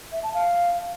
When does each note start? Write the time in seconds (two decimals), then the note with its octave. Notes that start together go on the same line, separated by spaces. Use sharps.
0.12 E5
0.23 A5
0.34 F5